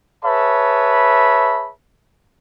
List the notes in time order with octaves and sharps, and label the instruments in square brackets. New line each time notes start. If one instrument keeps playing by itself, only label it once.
[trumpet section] G#4 B4 C#5 E5 A5 B5